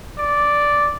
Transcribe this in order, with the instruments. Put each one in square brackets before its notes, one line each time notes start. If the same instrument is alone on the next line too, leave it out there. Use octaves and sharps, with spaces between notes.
[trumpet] D5